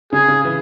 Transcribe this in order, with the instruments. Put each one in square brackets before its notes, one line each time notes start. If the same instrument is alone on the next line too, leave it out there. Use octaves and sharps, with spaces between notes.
[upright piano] C#3 [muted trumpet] G#4
[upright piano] C#3
E3